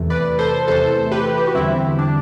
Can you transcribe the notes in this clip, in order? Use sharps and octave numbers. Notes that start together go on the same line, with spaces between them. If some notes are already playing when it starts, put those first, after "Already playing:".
Already playing: E2 C3 E3 A3
B4 D5
A4 C5
E2 C3 E3 A3 A4 C5
G4 B4
G4
F#4
E2 D3 G3 C4 E4
D4